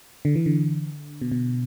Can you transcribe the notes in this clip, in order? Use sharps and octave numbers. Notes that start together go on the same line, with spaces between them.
D3
E3
D3
B2
B2